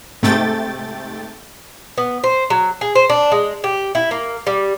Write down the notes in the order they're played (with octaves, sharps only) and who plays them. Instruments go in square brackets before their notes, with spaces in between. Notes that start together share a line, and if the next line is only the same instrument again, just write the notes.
[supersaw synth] G#2 C3 A3 G5 A6
[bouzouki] B3
C5
F#3
G#4
C5
D4
G#3
G4
E4
A#3
G3